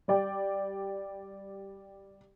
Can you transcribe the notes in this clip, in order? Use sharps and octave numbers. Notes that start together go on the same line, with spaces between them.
G3 D5 G5